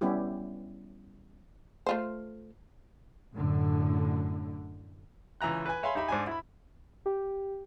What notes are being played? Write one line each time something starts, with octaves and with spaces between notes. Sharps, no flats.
G3 B3 C#4 E4 G4
A3 F4 C5
F#2 A2 D3
C#2 E3 E5 A#5 F#6
B4 G#5
C#5 E5 F5 G#5 B5 C6
D#4 G4 E5 B5
G#2 D4 G#5
E4 B5
G4